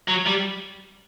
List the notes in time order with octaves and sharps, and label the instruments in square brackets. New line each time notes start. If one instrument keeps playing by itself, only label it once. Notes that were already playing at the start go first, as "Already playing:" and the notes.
[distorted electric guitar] F#3
G3